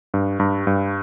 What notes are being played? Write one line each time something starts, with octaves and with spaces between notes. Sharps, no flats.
G2
G2
G2